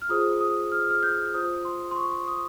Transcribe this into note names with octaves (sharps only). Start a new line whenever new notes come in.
F6
F4 G#4 C5 D#6
D#6
F6
F6
G6
F4 C5 D#6
C6
C6
C#6
D#6